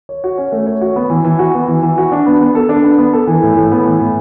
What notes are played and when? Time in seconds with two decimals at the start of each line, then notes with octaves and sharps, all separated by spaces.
0.09 C#5
0.24 F#4
0.38 C#4
0.52 A3
0.67 C#5
0.81 F#4
0.96 B3
1.10 E3
1.24 E3
1.39 F#4
1.54 B3
1.68 E3
1.82 E3
1.98 F#4
2.12 D4
2.26 B3
2.41 B3
2.55 A4
2.69 D4
2.84 B3
2.98 B3
3.13 A4
3.27 E3
3.42 A2
3.56 A2
3.72 B3
3.85 E3
4.00 A2